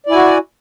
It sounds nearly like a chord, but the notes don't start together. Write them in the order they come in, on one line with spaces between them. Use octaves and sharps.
D5 E4 G#5 F#4